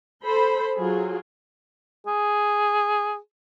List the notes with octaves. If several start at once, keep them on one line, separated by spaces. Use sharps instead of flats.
A4 C5 B5
F#3 F4 G#4
G#4